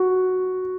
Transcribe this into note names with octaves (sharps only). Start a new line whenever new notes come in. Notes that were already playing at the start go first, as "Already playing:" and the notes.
Already playing: F#4